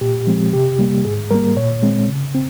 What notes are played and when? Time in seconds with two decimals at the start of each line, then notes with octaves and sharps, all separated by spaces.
0.01 A#2 G4
0.27 F3 G#3 C4
0.53 C3 G4
0.79 G3 A#3
1.05 G#2 G#4
1.31 G3 A#3 A#4
1.56 A#2 C#5
1.83 G#3 C4
2.09 C#3
2.35 C4